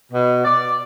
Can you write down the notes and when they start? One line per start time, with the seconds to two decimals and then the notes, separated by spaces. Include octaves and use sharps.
0.12 B2
0.45 D5